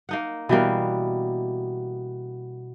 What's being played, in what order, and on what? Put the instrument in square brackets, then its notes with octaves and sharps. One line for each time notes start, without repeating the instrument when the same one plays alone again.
[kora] A#3 D#4 F#5
[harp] B2 [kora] E3 G3 A#3